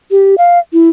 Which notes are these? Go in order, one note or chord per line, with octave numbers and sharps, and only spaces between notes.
G4
F5
E4